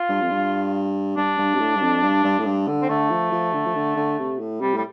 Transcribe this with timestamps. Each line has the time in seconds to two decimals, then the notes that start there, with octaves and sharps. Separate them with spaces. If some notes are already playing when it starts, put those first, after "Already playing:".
Already playing: F4
0.09 G2
0.21 F2
0.30 G2
1.16 G2 D4
1.38 G2
1.54 C3
1.59 A2
1.75 G2
1.81 F2
2.03 G2
2.24 G2
2.39 A2
2.45 G2
2.67 D3
2.82 C4
2.89 D3 A3
3.10 F3
3.32 F3
3.53 D3
3.66 F3
3.75 D3
3.96 D3
4.18 C3
4.39 A2
4.61 C3 G3
4.74 A2 G3